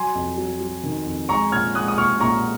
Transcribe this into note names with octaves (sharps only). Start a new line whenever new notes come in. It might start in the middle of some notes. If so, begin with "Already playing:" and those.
Already playing: F#3 G#5 C6
F2
F#3
F#3
D#3
F2
G#3 A#5 C#6
A#2 F6 G#6
G#3 D#6 F#6
D#6
A#2 C#6 F6
A#2 A#5 C#6